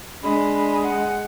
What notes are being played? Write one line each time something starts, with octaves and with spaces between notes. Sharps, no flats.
G#3 D4 B5
F#5